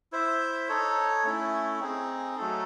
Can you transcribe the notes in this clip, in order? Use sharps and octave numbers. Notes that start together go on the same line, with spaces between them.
E4 C5 E5
D#4 A4 C#5
A3 C#4 E4
C4 D#4 G#4
F#3 A3 D#4 A4